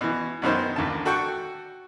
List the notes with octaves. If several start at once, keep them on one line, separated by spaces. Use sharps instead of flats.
B2 E3
F#2 B2 D#3 C5
A1 D#2 D3 A5
F#4 A4 F#5 G5 C#6